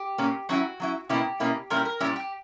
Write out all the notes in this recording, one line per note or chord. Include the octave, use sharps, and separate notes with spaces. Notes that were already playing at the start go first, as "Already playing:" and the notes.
Already playing: G4
A#2 A#3 C#4
F#3 C#4 E4 F#4
F#3 C#4 E4
B2 A#3 C#4 E4 G4
B2 A#3 C#4 E4
A#2 G3 C#4 E4 A#4
A#4
A#2 G3 C#4 E4 G4
G4